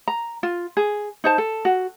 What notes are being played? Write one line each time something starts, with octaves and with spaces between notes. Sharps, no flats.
A#5
F4
G#4
D#4 C5 A5
A4
F#4